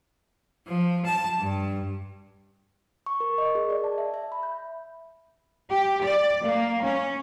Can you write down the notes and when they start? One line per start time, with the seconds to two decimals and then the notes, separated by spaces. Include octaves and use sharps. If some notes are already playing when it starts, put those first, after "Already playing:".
0.67 F3
1.05 A5
1.38 G2
3.06 C#6
3.20 A#4
3.38 D#5
3.55 G#4
3.70 D5
3.84 A5
3.98 E5
4.14 E5
4.32 B5
4.43 G6
5.72 G4
6.04 D5
6.44 A#3
6.84 C#4